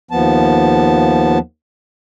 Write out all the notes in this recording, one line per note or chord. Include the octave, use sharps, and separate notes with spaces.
D#2 F3 B3 A5